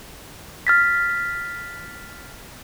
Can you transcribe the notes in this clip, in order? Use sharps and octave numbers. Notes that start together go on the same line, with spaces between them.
F6 A6 B6